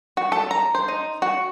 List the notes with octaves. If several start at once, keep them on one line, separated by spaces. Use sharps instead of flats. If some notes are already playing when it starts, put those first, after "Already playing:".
F#4
A4
A#5
C5
D#4
F#4